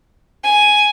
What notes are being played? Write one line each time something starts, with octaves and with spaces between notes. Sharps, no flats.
G#5